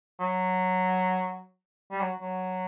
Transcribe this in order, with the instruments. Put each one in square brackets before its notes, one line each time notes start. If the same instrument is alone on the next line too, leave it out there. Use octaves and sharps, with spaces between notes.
[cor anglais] F#3
G3
F#3
F#3